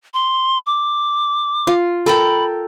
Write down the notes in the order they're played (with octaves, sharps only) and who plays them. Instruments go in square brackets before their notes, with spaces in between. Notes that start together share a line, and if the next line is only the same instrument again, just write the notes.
[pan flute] C6
D6
[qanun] F4
[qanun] A4 A#4 G5 [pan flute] B5